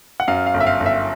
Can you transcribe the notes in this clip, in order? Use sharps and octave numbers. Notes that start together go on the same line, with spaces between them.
F#5
F#2 F5
F5
G1
E5
F5
G1
E5